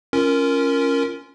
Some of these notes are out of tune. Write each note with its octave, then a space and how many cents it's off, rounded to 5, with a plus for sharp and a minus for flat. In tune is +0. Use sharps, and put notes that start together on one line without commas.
C#4 +0 F4 -20 A#4 +0